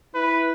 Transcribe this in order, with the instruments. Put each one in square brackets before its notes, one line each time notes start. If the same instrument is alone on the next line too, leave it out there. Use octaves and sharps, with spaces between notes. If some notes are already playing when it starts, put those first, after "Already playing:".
[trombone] E4 [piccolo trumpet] B4